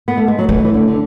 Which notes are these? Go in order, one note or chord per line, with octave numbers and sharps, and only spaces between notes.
B3
A3
G#3
F#3
E3 A3
E3
D3
D3